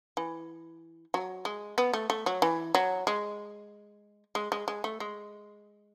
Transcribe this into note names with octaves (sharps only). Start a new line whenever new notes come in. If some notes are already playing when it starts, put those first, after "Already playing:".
E3
F#3
G#3
B3
A3
A3
F#3
E3
F#3
G#3
G#3
G#3
G#3
A3
G#3